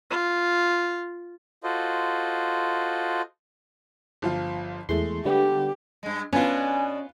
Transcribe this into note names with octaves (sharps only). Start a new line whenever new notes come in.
F4
F4 F#4 A4 C5 D#5
G1 F3 F4
E2 G#3 A3 C6
D3 G3 B3 G4
G2 G#3
B2 B3 C#4 D4 F4 B4 G#5